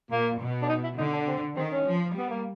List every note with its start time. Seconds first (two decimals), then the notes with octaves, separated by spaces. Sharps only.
0.11 A#2 A#3
0.40 B2
0.62 D4
0.69 D#4
0.84 E4
0.98 D3 D#4
1.13 D4
1.27 C4
1.56 D#3 C4
1.71 C#4
1.86 F3
2.14 G3 B3
2.30 A#3